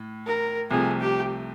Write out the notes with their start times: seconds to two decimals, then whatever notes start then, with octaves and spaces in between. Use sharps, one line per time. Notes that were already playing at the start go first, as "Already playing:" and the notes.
Already playing: A2
0.27 A#4
0.71 C2 C3 F3 A3 G#4
1.00 G4